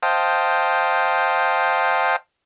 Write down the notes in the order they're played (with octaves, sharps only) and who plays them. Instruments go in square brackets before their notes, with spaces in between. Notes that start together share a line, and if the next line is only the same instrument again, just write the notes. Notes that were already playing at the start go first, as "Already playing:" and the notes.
[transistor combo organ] C5 D#5 F5 G5 A5